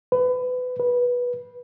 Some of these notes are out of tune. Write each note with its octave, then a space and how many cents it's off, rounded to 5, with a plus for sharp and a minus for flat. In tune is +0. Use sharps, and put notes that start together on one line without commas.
B4 +25
B4 -15